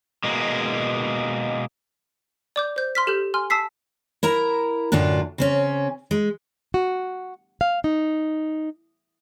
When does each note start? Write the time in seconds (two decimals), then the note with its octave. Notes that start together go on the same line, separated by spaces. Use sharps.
0.24 B2 G#3 A#3
2.56 D5 D6 G6
2.76 C5 G6
2.95 C6 F6 B6
3.07 G4 A4 F6 G6
3.34 G#5 C6 F6
3.50 A5 D#6 E6 B6 C7
4.23 E4 A#4 A#5
4.92 F#2 A2 D3 D4 F4
5.38 C#3 C4 C#4
6.11 G#3
6.74 F#4
7.61 F5
7.84 D#4